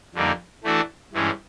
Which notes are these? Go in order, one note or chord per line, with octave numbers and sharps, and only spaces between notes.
F2 D3 G3 A#3 D#4
E3 A3 D4 F#4 A4
G2 E3 G#3 C#4